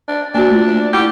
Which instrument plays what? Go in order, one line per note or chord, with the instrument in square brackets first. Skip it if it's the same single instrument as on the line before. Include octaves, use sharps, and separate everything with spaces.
[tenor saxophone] D4
[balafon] A#3 F#4 [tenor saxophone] D4
[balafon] A3 F4
D5
[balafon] E4 F#5 [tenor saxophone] G4